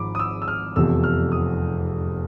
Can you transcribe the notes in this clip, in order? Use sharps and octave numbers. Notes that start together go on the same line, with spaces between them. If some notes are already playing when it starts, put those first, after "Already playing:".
Already playing: G#1 G#2 F3 B5 D6
D#6
E6
E6
F6
F1 E2 C3 F3 E6
F6
D#6